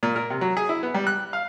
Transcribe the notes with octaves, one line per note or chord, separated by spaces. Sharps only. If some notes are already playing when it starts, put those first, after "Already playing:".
A#2
A#4
C3
F#3
G#4
E4
B3
G3
F#6
F5